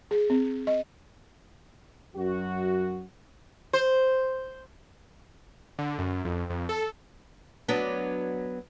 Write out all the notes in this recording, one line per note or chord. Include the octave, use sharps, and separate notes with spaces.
G#4
C4
D#5
F#2 F#4
C5
D3
F#2
F2
F2
A4
F#3 B3 D4